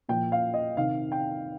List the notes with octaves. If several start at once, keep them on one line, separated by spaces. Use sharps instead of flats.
A#2 F3 G5
F5
D#5
C3 D#3 F5
G5